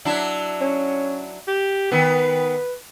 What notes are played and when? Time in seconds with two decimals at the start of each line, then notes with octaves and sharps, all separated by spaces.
0.05 F#3 D4 E4
0.61 C#4
1.47 G4
1.91 D#3 B3 B4